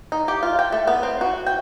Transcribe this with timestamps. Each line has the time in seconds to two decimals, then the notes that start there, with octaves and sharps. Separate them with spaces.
0.12 D#4
0.28 G4
0.43 F4
0.59 G5
0.72 A3
0.87 B3
1.03 C4
1.21 F#4
1.46 G5